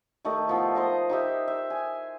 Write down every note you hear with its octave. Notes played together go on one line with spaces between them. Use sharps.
D#3 A3 G4 D#5
A2 F3 B3
C5 D#5 A#5
D#4 G4 E5
E5
G#5